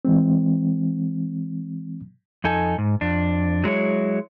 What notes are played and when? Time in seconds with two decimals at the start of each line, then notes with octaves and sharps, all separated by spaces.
0.05 E3 G#3 C4
2.44 F2 D#4 A4 G#5
2.78 G#2
3.01 F2 D4
3.64 F#3 G#3 E4 C#5